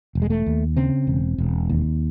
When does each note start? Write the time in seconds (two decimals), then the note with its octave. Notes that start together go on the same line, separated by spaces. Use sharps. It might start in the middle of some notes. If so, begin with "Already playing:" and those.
0.15 E1
0.22 G#3
0.30 A3
0.46 D#2
0.77 C#3 C4
1.07 E1
1.38 E1
1.69 D#2